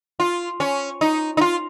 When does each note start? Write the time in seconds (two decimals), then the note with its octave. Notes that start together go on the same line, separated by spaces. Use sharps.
0.20 F4
0.60 C#4
1.01 D#4
1.37 D#4
1.41 F4